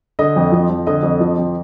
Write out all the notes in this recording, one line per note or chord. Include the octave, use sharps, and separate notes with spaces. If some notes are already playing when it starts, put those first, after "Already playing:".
D3 D#5
F2
F3
F2
D3 D#5
F2
F3
F2